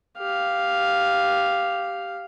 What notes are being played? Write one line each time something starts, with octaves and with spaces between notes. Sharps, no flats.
G4 F5